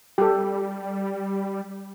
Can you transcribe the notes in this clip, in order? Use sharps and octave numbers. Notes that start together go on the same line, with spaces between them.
G3 G4 A4